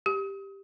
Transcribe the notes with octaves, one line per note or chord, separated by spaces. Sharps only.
G4